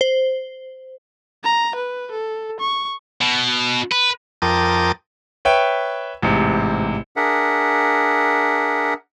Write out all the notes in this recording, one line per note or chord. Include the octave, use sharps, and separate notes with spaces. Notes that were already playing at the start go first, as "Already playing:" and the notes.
C5
A#5
B4
A4
C#6
B2
B4
F2 A#4 G5 A5 D6 D#6
B4 C#5 E5 G5
A1 G#2 C3
D4 G#4 A#4 E5 F#5